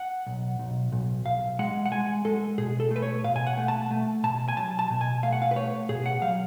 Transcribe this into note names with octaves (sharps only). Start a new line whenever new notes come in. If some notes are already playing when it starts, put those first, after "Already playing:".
Already playing: F#5
B1
B1
B1
B1 F5
G#3 F#5
F#5
G#3 G#5
G#3 A4
B2 G#4
A4
A3
B4
C#5
B2 F5
G#5
F#5
A3
A5
A3
B2 A5
G#5
F#3 A5
A5
B2
G#5
A3 F5
F#5
F5
B4
A3 C#5
B2 G#4
F#5
F#3 F5